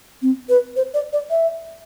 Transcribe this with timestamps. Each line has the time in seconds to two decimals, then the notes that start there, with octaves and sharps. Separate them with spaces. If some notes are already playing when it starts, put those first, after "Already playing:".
0.22 C4
0.49 B4
0.76 C5
0.94 D5
1.13 D5
1.30 E5